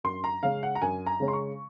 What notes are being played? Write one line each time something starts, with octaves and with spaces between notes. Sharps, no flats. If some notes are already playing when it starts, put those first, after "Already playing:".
F#2 C6
A#5
C#3 G#3 C#4 F5
F#5
A#5
F#2 G#5
A#5
C#3 G#3 C#4
C6
C#6